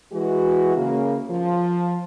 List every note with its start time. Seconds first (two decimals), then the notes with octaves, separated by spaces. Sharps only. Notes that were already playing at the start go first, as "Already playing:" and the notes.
0.13 E3 G#3 F#4
0.77 C#3 A#3
1.30 F3